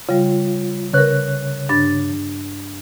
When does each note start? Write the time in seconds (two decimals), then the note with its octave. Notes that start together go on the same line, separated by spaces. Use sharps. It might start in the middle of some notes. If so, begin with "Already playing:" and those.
0.09 C#3 G3 F4
0.93 C#3 A#4 B4 C#5 F#6
1.69 G2 D4 A6